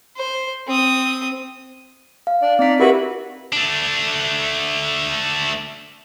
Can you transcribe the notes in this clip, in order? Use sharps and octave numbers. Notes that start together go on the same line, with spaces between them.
C5
C4 D#6
F5
D4 D5
C4 D#4 D5 B6
E4 F#4 G4 A#4 B4
A3 D4